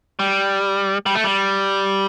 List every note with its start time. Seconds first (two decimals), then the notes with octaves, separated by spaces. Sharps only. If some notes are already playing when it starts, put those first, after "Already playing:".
0.19 G3
1.06 G3
1.15 A3
1.24 G3